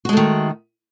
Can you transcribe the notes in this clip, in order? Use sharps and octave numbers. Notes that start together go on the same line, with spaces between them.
D#3 G#3 A3 F#4